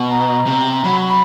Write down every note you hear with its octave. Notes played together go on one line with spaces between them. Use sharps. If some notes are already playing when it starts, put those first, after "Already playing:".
Already playing: B2
A#5
C3
F#3 B5
B5